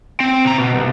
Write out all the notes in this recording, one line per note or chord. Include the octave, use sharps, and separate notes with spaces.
C4
C3 A#5
B2
C2